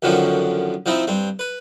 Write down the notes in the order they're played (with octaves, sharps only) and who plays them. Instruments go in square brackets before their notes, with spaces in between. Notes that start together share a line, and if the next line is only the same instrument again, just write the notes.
[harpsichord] F#2 D3 D#3 F3 C#4
F3 C4 D#4 E4
G2 C4
B4